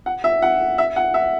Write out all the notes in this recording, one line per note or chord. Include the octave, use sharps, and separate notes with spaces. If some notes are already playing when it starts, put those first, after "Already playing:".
F#5
E5
F#5
E5
F#5
E5